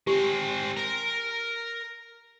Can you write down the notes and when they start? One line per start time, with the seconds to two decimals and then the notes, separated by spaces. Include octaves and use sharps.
0.07 G#3 C4 G4
0.77 A#4 A#5